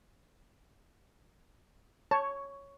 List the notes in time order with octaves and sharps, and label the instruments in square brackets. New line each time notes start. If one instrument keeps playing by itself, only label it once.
[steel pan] C#5 [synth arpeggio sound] A5